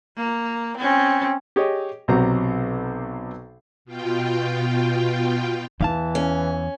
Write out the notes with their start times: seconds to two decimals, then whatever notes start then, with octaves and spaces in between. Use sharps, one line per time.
0.17 A#3
0.77 C4 C#4
1.56 G4 G#4 C#5 D#5
2.08 B1 C3 F#3 F#4 C5 A#5
3.85 B2 F4 G5
5.81 E2 E3 E4 F5 A5
6.15 C#4